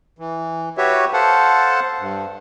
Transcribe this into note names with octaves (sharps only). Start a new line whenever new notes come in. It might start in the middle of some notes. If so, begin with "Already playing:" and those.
E3
F#4 G4 B4 C#5 E5
A4 C5 F5 F#5 A5
G2